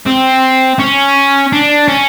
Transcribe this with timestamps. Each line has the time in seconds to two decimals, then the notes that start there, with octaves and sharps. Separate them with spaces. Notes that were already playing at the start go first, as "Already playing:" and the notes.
0.06 C4
0.79 C#4
1.52 D4
1.88 C#4